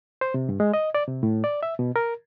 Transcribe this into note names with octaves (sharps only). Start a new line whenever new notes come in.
C5
C3
G2
G#3
D#5
D5
C3
A2
D5
E5
B2
A#4